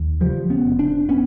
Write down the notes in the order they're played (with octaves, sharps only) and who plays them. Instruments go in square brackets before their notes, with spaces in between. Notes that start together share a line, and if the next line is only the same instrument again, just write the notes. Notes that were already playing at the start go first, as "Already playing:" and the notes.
Already playing: [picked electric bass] D#2
C#3 F3 G3
B3 C#4
F1
C4 D4
B3 C#4